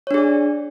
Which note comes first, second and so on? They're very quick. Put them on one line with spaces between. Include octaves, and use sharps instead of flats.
C#5 D4 G#4 D5